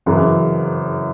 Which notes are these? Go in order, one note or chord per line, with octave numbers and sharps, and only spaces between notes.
F#1 F#2 C#3 E3